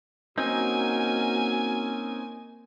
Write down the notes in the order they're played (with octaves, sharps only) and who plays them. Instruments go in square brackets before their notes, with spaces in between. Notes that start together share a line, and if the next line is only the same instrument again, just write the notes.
[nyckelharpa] A#3 [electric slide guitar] C4 C#4 D#4 [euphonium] F#4 [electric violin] G#5